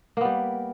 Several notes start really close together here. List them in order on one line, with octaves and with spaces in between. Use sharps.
A#3 B3 G3